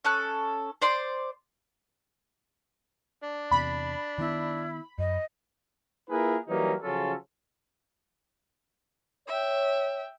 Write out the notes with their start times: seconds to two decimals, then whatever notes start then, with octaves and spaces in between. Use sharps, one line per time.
0.05 C#4 A4 F#6
0.82 C5 D5 C6
3.24 D4
3.51 E2 C3 B5
4.18 D#3 B3 E4
4.98 F#2 D#5
6.08 A#3 E4 F4 G#4 A#4 B4
6.47 E3 F#3 G3 A#3 C#4 D#4
6.81 C#3 F3 F#3 C#4 F4 A4
9.28 C#5 E5 G5